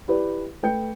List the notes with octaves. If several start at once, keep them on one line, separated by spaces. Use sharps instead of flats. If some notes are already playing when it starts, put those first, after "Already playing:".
E4 G4 B4 D5
A3 B4 G5 G6 C#7